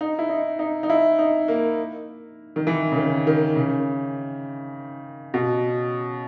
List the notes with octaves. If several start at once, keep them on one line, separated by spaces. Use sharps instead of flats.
D#4
E4
D#4
D#4
D#4
E4
D#4
A#3
D#3
E3
C#3
D#3
D#3
C#3
B2